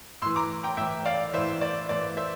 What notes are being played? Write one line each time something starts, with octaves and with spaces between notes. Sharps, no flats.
A2 E3 C6 E6
A#5 D6
G5 A#5
A2 E3 E5 G5
D5 F5
A2 E3 C5 E5
D5
A2 E3 D5
C5 E5